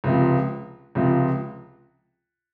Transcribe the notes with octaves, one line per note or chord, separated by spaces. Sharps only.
C#2 C3 F3
C#2 C3 F3